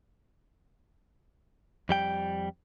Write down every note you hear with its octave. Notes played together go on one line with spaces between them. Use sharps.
F2 G3 G5